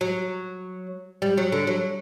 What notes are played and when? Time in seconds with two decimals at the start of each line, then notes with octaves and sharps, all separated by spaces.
0.01 F#3
1.22 G3
1.38 F#3
1.52 D3
1.67 F#3